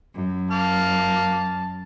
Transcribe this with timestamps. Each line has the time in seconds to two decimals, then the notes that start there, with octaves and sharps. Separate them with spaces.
0.15 F#2
0.51 A#3 A5 F6